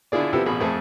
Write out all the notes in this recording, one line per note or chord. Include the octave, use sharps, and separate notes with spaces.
D3 D4 E4 F4 G#4 D5
C3 F3 B3 E4 G4 A4
A1 B2 G#4 B5
F2 A3 C4 G#4